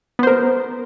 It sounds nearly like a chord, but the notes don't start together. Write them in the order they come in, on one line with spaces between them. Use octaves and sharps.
B3 C5 A#4